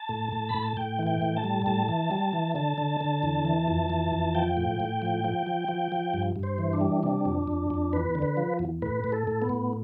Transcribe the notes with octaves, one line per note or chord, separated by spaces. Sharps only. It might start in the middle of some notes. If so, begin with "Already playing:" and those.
Already playing: A5
A2
A2
B5
A2
A5
A2 G5
E3
G5
A2
A5
G3
A2 A5
E3
G3
E3
D3 A5
D3
D3
E2
E3
F2
E3
F2
F3 G5
A2
A2
F3
F3
F3
F3
F3
G2
G2
C5
E3
D4
G3
C3 D4
F2
F2
F2
E2 B4
D3
B4
F3
E2
A2 B4
A2
A4
A2
B3
A2